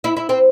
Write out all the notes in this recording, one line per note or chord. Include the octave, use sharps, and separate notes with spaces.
E4
E4
C4